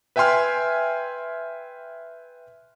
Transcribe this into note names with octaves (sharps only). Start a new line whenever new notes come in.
B4 E5 G5 G#5 C6 F6